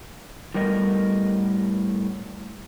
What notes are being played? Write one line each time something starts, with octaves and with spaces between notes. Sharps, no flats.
A2 G3 B3 A#4 D#5